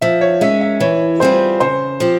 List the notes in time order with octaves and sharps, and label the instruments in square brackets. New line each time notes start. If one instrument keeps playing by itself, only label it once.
[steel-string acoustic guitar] F3 [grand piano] E5
[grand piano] C#5
[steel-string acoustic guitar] G#3 C#4 [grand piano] E5
[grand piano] E5
[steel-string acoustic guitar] E3 [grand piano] C#5
[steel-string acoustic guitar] G3 C4 F4 G#4 [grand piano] C5
[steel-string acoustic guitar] C#3 [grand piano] C5
[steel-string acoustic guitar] F3 C4 G4